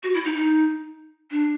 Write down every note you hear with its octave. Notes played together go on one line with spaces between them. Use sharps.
F#4
E4
D#4
D#4
D4